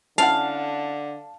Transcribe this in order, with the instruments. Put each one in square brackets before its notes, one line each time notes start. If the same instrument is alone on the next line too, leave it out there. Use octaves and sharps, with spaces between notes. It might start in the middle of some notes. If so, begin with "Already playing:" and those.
[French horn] D3 [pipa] C#4 E4 F#5 [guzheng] F5 [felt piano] A5